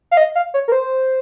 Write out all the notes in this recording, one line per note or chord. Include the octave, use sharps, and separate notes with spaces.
F5
D#5
F5
C#5
A#4
C5